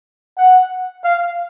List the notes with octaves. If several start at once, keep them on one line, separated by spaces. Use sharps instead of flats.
F#5
F5